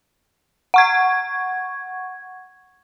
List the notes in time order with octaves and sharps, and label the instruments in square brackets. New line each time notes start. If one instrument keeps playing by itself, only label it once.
[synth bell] F#5 C#6 G#6